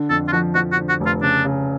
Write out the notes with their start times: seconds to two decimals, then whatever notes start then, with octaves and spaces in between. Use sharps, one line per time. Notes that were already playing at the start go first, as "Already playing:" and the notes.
Already playing: D3
0.10 F2 A4
0.28 F4
0.32 F3 F#4
0.55 F3 F#4
0.72 F#4
0.77 D3
0.89 F#4
1.00 F1
1.06 F4
1.22 C#3 D4
1.45 C#3